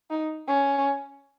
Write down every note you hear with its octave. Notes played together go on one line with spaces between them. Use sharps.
D#4
C#4